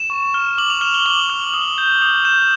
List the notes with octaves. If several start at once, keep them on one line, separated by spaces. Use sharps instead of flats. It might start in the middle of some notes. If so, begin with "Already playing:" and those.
Already playing: E7
C#6
F6
D6 F#7
F7
F6 E7
G7
D6 F#7
F6
D#6
G6
D#6 F7
G6 E7